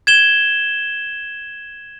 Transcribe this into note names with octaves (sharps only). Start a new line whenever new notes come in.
G#6 E7 G7